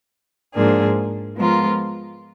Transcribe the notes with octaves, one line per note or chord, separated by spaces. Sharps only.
G#2 F3 A#3 D4 G#4
F3 G#3 B3 F4 A#4